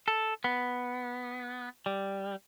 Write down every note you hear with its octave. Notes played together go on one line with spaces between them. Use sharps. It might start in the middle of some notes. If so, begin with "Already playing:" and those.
A4
B3
G3